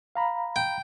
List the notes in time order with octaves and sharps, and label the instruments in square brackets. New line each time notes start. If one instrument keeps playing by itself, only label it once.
[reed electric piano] F5 A#5 B5
[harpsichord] G5